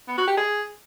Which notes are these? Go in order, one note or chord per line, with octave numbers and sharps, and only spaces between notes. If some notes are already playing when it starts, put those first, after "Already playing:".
B3
F#4
G4
G#4